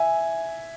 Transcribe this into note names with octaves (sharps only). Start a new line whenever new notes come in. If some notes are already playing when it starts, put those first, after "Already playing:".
Already playing: E5 G#5